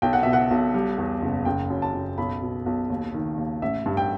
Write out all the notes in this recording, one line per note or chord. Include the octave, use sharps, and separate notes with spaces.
B1 G5
F#5
B2 E5
F#5
B1
G3
E2
F#1
F#1 G5
F#2
A5
F#1
B1 B5
B2
B1
D#2
D#3
D#2
A1 E5
G2
G5